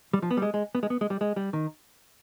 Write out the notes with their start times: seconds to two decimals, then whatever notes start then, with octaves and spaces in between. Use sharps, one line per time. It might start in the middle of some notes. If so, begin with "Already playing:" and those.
0.13 G3
0.22 F3
0.31 B3
0.37 G3
0.42 G#3
0.54 G#3
0.75 B3
0.83 G#3
0.90 B3
1.01 G#3
1.10 G3
1.21 G#3
1.36 G3
1.53 D#3